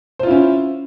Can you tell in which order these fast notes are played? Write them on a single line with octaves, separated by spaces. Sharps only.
C5 F4 E4 C#4